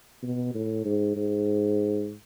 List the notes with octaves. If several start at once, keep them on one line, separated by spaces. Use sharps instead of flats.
B2
A2
G#2
G#2